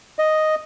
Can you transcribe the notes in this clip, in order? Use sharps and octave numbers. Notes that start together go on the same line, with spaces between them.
D#5